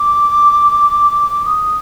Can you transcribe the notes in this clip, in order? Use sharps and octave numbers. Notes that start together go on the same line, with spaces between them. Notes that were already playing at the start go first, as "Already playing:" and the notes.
Already playing: D6
D#6